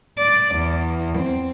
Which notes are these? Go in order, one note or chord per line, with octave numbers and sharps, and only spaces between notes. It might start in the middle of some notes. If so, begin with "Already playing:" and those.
D5
E2
C4